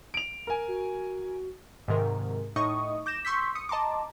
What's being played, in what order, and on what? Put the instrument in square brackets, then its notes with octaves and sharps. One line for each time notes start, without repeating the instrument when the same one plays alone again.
[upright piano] D7 F7
A#4 G#5
[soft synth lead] F#4
[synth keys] G#2 C3 D#3 A#4
A2 D#4 D#5 C#6 D#6
D6 G6 A#6 E7
C6 C#6 E6 G6 B6
D#6 C#7
D#5 A5 A#5 C6 D6